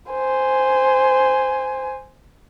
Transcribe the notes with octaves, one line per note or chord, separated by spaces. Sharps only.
C5 G#5